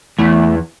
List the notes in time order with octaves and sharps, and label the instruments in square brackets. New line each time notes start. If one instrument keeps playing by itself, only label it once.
[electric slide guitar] E2 E3 [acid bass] A3